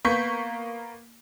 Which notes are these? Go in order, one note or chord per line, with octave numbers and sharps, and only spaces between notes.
A#3 B3 C#6 G6 B6